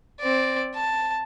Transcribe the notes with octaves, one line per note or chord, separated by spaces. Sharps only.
C4 D5
A5